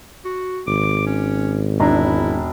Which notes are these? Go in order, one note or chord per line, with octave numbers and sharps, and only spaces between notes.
F#4
G#1 D6
C#4
E1 D4 E4 A#5